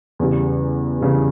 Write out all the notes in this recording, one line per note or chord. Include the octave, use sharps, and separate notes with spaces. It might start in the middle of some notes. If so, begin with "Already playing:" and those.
E2 C#3 G3
E2 C#3 G3